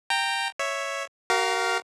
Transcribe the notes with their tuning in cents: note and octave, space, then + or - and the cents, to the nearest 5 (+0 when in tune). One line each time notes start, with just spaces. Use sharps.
G5 +5 A#5 -15
C#5 +0 E5 +0
F#4 +35 A#4 +0 F5 +0